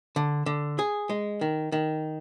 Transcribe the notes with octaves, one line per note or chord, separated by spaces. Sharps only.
D3
D3
G#4
G#3
D#3
D#3